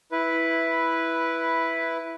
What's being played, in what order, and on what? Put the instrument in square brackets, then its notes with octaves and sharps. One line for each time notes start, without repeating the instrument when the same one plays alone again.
[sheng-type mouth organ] E4 B4